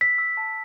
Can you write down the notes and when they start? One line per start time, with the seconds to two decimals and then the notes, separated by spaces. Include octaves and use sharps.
0.01 E6 B6
0.18 E6
0.37 A5